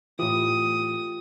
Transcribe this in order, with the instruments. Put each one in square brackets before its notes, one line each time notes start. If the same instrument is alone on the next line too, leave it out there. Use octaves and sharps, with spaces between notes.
[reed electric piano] A2 E3 [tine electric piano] F4 G4 [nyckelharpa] D#6